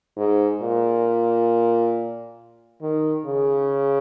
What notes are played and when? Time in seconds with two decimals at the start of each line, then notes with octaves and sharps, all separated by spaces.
0.17 G#2
0.61 A#2
2.82 D#3
3.26 C#3